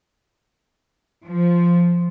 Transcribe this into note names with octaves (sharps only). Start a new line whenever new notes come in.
F3